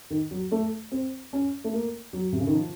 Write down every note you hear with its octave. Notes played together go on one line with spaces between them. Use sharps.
D#3
F#3
A3
C4
C#4
A3
A#3
F#3
C3
C#3
D#3
F3